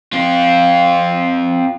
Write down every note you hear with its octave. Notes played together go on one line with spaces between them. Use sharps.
C4 F4